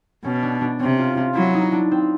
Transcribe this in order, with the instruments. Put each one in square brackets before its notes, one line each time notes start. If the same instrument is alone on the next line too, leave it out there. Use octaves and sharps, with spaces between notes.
[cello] B2 [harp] C#4
[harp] D4
D4
[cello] C3 [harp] C#4
[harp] F4
F4
[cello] F#3 [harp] E4
[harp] D#4
D4
C4